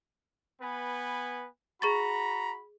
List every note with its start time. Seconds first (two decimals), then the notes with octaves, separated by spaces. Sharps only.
0.62 B3 B4 G#5
1.82 F#4 G#4 A#5 B5 C#6 A6